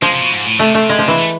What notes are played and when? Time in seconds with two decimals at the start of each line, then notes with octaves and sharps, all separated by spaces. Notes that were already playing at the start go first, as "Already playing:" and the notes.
0.02 F3 G#3
0.12 C3
0.21 B2
0.31 G#2
0.46 A2
0.59 C3 A3
0.74 A3
0.89 G#3
0.98 F3
1.08 E3
1.18 A3